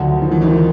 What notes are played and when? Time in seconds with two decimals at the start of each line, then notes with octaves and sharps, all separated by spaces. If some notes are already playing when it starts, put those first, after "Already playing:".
Already playing: D2 D3 D#3 F3 F#3
0.22 F3
0.31 E3
0.41 D#3 F3